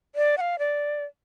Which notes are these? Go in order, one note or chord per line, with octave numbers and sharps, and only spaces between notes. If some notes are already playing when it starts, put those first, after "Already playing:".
D5
F#5
F5
D5